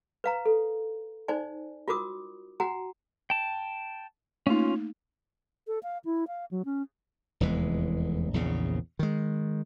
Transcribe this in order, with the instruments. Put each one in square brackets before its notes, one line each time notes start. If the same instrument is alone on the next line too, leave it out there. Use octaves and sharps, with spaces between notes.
[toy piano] B4 F5 A#5
A4
D#4 C5 D5 G#5
F4 F#4 A#4 D6 D#6
F#4 F#5 G#5 A#5
[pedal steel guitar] G5 A5
[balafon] A3 A#3 D#4 [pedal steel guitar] C#4 F4
[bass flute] A4
F5
E4
F5
F#3
C#4
[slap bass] F1 E2 E3 G#3
A#1 E2 C#3
D#3 G#3